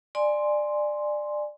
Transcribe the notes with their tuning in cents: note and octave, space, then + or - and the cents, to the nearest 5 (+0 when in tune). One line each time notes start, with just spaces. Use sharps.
D5 +20 G#5 +0 C6 +0